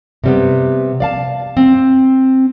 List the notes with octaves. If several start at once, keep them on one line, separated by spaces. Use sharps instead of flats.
C3 G3 B3
D5 F5 A5
C4